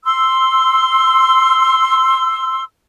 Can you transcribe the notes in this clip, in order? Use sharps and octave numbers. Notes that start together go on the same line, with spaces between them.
C6 E6